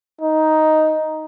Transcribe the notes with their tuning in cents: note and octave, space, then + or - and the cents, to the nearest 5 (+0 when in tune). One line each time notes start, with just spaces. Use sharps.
D#4 +5